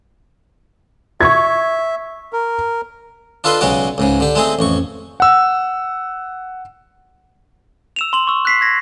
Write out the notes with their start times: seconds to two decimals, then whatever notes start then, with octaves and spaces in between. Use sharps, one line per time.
1.21 E5 C#6 G#6
2.33 A#4
3.44 D4 F4 A4 B4 D#5 C6
3.61 B1 C#3 G#3 F#4 D5
3.98 C#2 G#2 C#3
4.20 D3 G4
4.35 G#3 A3 C4 D#4 G#4
4.59 A1 F2 C#6
5.20 F#5 E6
7.96 E6 E7 F7
8.13 C6 F#7
8.27 C#6 E6
8.45 F#6 B6 C7
8.61 G#6 A#6